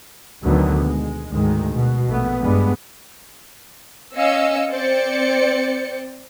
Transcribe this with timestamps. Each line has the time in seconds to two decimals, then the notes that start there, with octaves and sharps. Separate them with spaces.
0.43 D2 B2 D3 D#3 F#3 B3
0.84 G#3
1.31 D2 G#2 D#3 G#3
1.73 B2
2.07 A#1 A3 B3
2.42 G2 G3 G#3 B3
4.17 C#4 D#5 F5 E6 C#7
4.70 C4 C5 D5 C#7